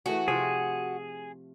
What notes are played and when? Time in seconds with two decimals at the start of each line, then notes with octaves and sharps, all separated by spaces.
0.06 E3 A3 F#4 G#4
0.28 C3 F3 G#4 G5